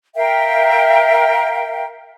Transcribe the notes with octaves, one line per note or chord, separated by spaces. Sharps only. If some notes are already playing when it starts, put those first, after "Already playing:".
A#4 E5 F5 G5